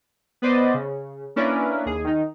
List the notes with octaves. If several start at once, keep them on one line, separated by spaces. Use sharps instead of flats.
B3 B4 C5 D5 D#5
C#3
A#3 C#4 D4 E4 A#4 B4
D#2 G#4
D#3 D#4